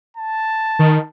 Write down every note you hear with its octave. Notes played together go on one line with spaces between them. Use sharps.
A5
D#3